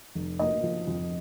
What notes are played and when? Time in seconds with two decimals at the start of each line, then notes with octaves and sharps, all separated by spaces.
0.15 F1
0.39 A#3 D#5
0.63 F3
0.88 F2